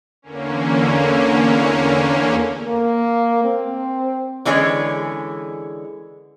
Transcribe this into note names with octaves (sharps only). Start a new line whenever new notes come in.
E2 D3 A#3 C#4
A#3
C4
D3 E3 G#3 C#4 G#4 C#5